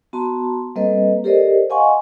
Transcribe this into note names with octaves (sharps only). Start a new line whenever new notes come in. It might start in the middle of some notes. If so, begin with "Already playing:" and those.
B3 F#4 A5 A#5 C6
G3 A#3 C4 A4 B4 D#5
G4 A4 A#4 C5 D5 D#5
D#5 F5 F#5 G#5 C6 C#6